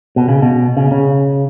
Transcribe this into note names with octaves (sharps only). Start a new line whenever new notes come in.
B2
C#3
B2
C#3
C#3